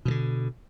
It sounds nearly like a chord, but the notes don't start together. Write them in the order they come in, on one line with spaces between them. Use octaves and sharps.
B2 E3 D3